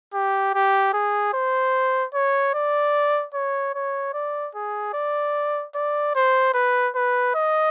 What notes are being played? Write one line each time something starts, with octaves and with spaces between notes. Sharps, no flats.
G4
G4
G#4
C5
C#5
D5
C#5
C#5
D5
G#4
D5
D5
C5
B4
B4
D#5